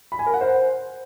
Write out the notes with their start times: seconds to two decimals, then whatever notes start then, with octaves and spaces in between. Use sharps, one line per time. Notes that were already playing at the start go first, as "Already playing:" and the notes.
0.12 B5
0.19 G#5
0.26 A#4
0.34 F#5
0.41 C5